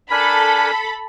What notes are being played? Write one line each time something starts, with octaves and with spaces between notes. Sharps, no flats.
D4 A4 A#4 G#5 B5